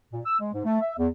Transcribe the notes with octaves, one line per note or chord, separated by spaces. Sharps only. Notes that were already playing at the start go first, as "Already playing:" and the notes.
A#2
E6
G#3
G#2
A3
E5
E2